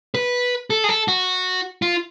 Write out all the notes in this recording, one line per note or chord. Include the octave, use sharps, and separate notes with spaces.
B4
A4
G#4
A4
F#4
F4